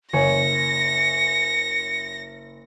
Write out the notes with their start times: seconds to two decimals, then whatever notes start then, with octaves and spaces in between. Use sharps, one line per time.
0.13 F#1 C#5 G#5 A#6 C#7